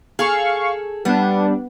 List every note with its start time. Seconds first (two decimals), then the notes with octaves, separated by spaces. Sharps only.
0.19 G#4 A4 F5 C#6
1.05 G3 B3 D4